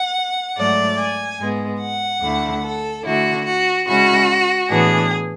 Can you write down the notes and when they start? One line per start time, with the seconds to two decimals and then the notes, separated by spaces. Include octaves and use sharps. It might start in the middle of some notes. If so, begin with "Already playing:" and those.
Already playing: F#5
0.57 G#2 F#3 A3 D5
0.98 G#5
1.39 G#2 G#3 B3
1.81 F#5
2.22 D2 D3 A3 E4
2.64 A4
3.04 D3 A3 E4 F#4
3.46 F#4
3.87 C#3 G#3 C#4 E4 F#4
4.69 A2 E3 B3 D4 G#4